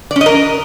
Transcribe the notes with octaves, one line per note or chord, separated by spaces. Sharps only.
D5
C#4
D#5
A#4